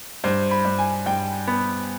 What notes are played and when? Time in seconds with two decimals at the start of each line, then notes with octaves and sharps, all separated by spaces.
0.24 G2 C5
0.51 B5
0.65 G2
0.79 G#5
1.06 G2 G5
1.47 B3 B5